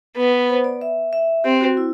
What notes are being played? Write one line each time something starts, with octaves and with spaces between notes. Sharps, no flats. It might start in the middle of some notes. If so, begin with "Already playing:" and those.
B3
B4
C5
D5
E5
E5
C4 G4
F#4
E4